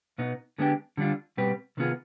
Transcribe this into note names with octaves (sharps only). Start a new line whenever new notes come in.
B2 B3 D#4
D3 G#3 B3 D4 G4
D3 G3 D4 F4
B2 G3 C4 G4 B4
C3 D#3 B3 F4 G#4